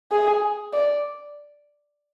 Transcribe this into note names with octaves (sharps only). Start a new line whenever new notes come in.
G#4
D5